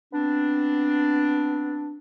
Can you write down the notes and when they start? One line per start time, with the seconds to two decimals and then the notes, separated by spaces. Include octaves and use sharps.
0.13 B3 C4 D4